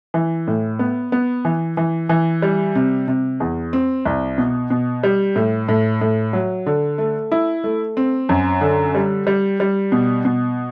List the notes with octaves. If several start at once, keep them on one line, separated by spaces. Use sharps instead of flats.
E3
A2
B3
B3
E3
E3
E3
G3
C3
C3
E2
C4
C2
B2
B2
G3
A2
A2
A2
F#3
D3
A3
E4
A3
C4
F#2
D3
G3
G3
G3
B2
B2